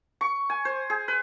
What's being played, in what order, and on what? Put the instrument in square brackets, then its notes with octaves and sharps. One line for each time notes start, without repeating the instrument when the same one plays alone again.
[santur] C#6
G#5
C5
G#4
B4